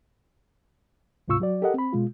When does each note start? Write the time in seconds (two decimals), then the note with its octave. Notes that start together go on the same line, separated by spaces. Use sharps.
1.28 D2 G#2 C3 F4 C#6 E6
1.40 F#3 F#4 D5
1.62 G4 A4 A#4 D#5 F#5
1.74 C4 B5
1.93 B2 G#3 F4